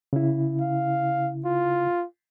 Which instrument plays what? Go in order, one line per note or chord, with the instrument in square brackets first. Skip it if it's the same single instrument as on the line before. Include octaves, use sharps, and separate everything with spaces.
[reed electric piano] C#3 E4
[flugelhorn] F5
F4